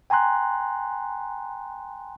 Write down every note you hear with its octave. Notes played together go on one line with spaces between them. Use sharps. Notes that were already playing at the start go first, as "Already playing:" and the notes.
G5 G#5 A#5 C6 F#6